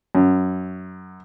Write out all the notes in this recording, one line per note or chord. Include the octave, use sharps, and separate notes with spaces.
F#2